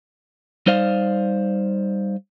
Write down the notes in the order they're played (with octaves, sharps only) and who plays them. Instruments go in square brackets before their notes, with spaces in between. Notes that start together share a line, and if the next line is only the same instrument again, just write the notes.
[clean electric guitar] G3 D#4 C5 D5 F5